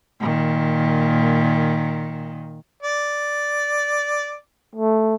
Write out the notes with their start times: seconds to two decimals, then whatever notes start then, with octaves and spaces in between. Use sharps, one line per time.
0.20 A#2 D#3
2.82 D5
4.75 A3